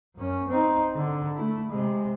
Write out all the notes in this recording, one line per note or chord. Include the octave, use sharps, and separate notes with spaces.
F#2 C#4
C4 D#4
D3
A3 E4
C3 G#3